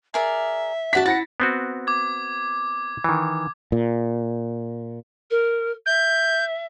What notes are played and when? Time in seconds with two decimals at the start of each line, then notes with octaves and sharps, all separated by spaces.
0.14 G#4 A#4 D5 E5
0.93 F#4 D5 F#5 A5 B6
1.06 E4 F#5 A6 A#6 C#7
1.40 B3 C4 F#4
1.87 D6 G#6
3.04 D#3 E3
3.72 A#2
5.30 A#4
5.86 E5 G6